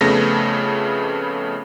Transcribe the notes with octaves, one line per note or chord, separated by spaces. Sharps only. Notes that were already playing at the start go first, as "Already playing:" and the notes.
F2 C#3 A3 B3 A#6